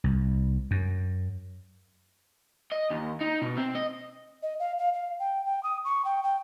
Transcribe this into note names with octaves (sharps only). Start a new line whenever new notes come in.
C2
F#2
D#5
D#2
D#4
B2
C4
D#5
D#5
F5
F5
F5
G5
G5
D#6
C#6
G5
G5